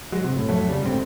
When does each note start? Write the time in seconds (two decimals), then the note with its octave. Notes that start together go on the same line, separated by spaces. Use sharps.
0.12 F#3 G#3
0.24 C3
0.36 A2
0.49 F2 F#3 A3
0.68 C#3 G3
0.82 D#1 D2 G#2 C4